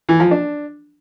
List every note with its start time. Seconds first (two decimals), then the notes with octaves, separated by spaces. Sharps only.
0.09 E3
0.20 F3
0.31 D4